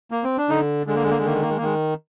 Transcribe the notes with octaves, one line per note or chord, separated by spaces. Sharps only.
A#3
C4
D4
D3 D#4
D3 G#3
A#3
G#3
A#3
G#3
D#3 A#3
G#3
A#3
G#3
A#3
D#3 G#3